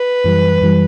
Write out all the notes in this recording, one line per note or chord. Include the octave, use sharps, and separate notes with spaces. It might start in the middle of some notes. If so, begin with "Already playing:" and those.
Already playing: B4
F#2 E3 G3
F#2 E3 G3